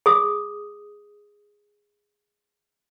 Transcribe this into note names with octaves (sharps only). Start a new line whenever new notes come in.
G#4 D#6